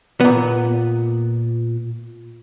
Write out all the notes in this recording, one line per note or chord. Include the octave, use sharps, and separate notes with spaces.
A#2 B3